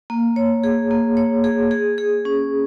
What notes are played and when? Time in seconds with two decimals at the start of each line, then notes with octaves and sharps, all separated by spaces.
0.10 A#3
0.36 C#5
0.64 G#4
0.91 A#3
1.17 C#5
1.44 G#4
1.71 G#4
1.98 G#4
2.25 C#4